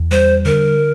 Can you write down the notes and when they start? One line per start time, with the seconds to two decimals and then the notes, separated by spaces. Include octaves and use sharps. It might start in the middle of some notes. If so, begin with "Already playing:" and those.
Already playing: E2
0.11 G3 C5
0.45 D3 A#4